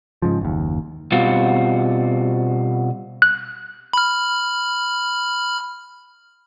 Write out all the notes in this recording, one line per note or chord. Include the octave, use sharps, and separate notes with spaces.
G#2 C#3 F3
F#1 D#2
B2 G3 C4 F4 F#4
F#6
B5 F6